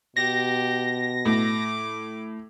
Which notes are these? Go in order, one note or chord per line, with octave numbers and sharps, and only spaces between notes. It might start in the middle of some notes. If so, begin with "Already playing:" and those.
B2 G4 A#6
A2 D6